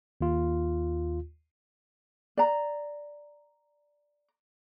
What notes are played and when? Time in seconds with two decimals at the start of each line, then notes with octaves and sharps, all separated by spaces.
0.21 D#2 F4
2.37 D5 A#5